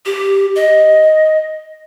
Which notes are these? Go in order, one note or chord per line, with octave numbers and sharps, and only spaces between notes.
G4
D#5